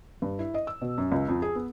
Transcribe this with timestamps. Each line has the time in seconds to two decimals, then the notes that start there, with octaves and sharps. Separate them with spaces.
0.22 G2
0.39 E4
0.54 D#5
0.67 E6
0.82 B2
0.98 F#2
1.12 C#2
1.28 F2
1.42 G#4
1.56 B3